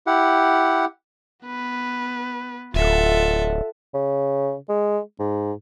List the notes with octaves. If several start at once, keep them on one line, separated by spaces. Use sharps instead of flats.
E4 G4 F#5
B3 B4
D1 F4 A4 E5 F#5
C#3
G#3
G#2